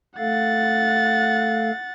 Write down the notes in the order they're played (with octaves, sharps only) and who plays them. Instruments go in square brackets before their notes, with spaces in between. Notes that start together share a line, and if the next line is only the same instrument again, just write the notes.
[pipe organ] A3 A4 F5 [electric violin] F#5 A6